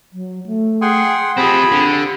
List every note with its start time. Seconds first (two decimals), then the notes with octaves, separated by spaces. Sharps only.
0.13 F#3
0.46 A3
0.82 G#4 F#5 G5 C6
1.38 F3 C4 G4 G#4 B5
1.72 D3